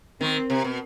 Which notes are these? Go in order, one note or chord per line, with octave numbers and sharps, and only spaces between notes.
D#3 C4
C3
B2